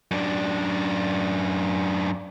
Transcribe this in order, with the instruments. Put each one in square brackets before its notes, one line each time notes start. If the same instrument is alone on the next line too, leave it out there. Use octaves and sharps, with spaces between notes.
[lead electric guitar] F#2 D4